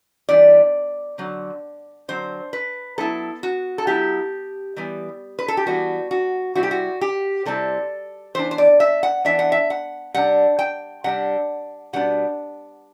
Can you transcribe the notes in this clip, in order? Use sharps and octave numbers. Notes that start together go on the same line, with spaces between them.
E3 G3 B3 D4 D5
D3 F#3 C4
D3 F#3 C4 C5
B4
F#3 B3 E4 A4
F#4
A4
F#3 B3 E4 G4
E3 G3 B3
B4
A4
G4
E3 G3 B3 F#4
F#4
C3 G3 C4 E4 F#4
G4
F#4
G4
C3 G3 C4 E4 A4
E3 B3 D4 C5
C5
D5
E5
F#5
E3 B3 D4 E5
F#5
E5
F#5
C3 G3 D4 F#5
G5
C3 G3 D4 F#5
B2 G3 B3 D4 F#5